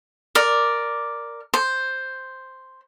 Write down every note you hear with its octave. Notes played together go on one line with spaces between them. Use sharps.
A#4 D5
C5